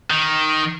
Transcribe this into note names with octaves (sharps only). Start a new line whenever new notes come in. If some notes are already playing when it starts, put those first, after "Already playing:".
D#3